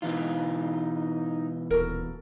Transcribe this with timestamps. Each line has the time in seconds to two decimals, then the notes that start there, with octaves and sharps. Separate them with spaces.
0.02 B2 E3 D#4 F4
1.71 D#1 F#4 A4 A#4